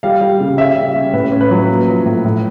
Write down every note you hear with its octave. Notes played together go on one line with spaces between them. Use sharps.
G3 F5
G3
C#3
C#4 E5
G3
C#4
A2 B4
C#4
B4
F#3
A#3
F3
A2
A2